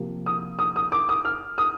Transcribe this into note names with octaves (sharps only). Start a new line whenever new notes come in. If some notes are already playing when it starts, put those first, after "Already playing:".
Already playing: C3 F3 A#3
D#6
D#6
D#6
D6
D#6
F6
D#6